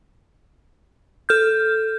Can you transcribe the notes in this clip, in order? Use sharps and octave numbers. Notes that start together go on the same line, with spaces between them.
A4 F6 G6